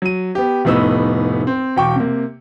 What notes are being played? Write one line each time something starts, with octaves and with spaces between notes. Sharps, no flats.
F#3 D#7
B3 G4
F1 A2 B3 D#4 E6
C4
E1 G5 C#6 D6
C3 A#3